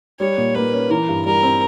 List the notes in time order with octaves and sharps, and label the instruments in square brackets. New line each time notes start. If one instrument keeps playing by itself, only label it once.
[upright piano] G3 [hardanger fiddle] C#5
[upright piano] A#2
[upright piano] A#3 [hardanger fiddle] B4
[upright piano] C#4
[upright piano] E3 [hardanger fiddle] A#4
[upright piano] G2
[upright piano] G3 [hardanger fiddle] A#4
[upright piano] C4